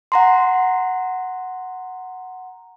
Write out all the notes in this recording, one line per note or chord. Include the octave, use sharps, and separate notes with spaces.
F#5 A#5 C6